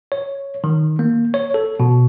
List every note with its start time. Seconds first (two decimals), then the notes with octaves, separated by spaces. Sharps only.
0.12 C#5
0.64 D#3
0.99 A#3
1.34 C#5
1.54 A4
1.80 B2